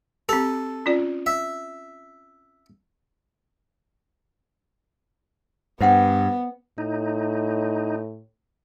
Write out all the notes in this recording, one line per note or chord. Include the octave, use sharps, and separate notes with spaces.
C4 G4 A4
C#4 F4 D5
E5
G2 B3 C5 F#5 G5
A2 D#4